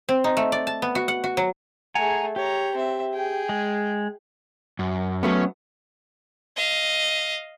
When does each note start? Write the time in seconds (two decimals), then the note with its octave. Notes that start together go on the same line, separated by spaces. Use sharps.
0.09 C4
0.24 D#4
0.37 A3
0.52 D5
0.67 A5
0.82 B3
0.95 F#4
1.08 F#5
1.24 F#4
1.37 F#3
1.95 A3 G#4 F#5 G#5 A#5
2.36 G4 C#5 A#5
2.75 C4 E5
3.14 G#4 G5
3.49 G#3
4.79 F#2
5.23 F#3 A3 B3 C#4
6.56 D#5 F5